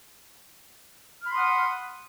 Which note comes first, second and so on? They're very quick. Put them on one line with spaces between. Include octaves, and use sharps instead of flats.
F6 B5 C6 D#6 F#5